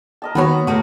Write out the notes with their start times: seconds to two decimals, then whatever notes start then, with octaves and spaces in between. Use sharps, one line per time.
0.22 A#4 D#5 A5
0.35 D#3 A#3 B3 F#4 B4 C#5 A#5
0.67 A2 A3 A#3 F#4 A#4